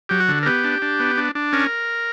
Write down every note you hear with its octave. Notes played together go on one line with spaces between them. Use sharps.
F#3 G4
F#4
D3
A#4
B3 G4
D4
D4
B3
D4
D4
C#4 A#4